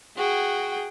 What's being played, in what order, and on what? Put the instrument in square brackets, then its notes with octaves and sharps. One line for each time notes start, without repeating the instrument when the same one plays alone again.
[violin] F#4 G5 [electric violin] G#4